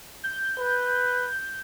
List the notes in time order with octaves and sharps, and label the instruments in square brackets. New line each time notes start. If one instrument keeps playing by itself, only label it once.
[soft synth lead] G6
[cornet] B4